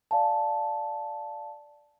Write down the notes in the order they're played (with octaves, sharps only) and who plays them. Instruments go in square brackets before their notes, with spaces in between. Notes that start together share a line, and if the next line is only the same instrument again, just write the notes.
[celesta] D5 F5 G#5 A5